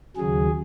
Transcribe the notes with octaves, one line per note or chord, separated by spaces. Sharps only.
D#2 C#3 F#3 G#4